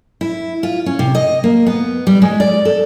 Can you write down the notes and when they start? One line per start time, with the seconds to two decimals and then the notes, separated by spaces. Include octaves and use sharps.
0.21 E4
0.63 F4
0.86 C#4
0.99 C3
1.15 D#5
1.44 A#3
1.67 B3
2.07 G3
2.22 G#3
2.40 D5
2.65 A4